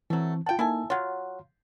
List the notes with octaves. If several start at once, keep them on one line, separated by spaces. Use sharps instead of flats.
E3 F#3 A3 C4
F4 F#5 G5 A5
A#3 D#4 E4 A4 G#5
F#3 F4 C#5 F#5